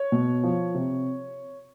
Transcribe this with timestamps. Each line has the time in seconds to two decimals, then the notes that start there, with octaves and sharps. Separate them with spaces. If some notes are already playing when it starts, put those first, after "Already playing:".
Already playing: C#5
0.12 B2
0.43 F3
0.75 C3